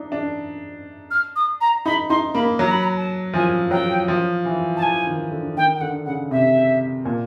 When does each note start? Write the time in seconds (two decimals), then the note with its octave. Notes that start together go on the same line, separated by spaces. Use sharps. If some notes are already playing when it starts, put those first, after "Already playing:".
Already playing: D4 D#4
0.12 D4
1.11 F6
1.36 D#6
1.61 A#5
1.86 D#4 B5
2.10 D#4 C6
2.34 A#3 B5
2.59 F#3 A#5
2.71 B5
2.83 A#5
2.97 A5
3.34 F3 G#5
3.71 F#3 G5
4.08 F3
4.45 E3
4.77 A5
4.82 E3 G#5
5.07 D#3
5.31 D3
5.57 D#3 G5
5.75 G5
5.81 D3 F#5
6.06 C#3 F#5
6.31 C3 E5
7.05 A#2